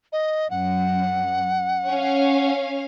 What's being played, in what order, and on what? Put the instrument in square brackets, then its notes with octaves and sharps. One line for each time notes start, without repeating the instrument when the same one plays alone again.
[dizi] D#5
[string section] F#2 [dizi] F#5
[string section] C#4 F5